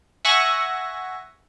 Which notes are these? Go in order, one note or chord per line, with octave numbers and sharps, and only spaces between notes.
E5 F#5 G#5 C#6 A#6